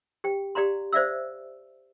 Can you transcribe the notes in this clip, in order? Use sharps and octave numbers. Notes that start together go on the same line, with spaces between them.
G4 G5
G4 D5 F5 A#5 C6
C5 D5 E5 F5 E6